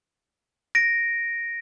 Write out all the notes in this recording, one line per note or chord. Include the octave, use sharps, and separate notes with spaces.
A#6 D7